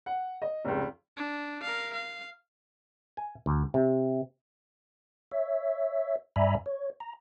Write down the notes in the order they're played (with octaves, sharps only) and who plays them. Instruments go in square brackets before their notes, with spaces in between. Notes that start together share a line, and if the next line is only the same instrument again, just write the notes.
[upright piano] F#5
D#5
F1 C#2
[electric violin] D4
A#4 F5
F5
[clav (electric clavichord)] G#5
D2
C3
[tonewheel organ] C#5 E5
G2 D5 E5 G#5 A#5 B5
C#5
A#5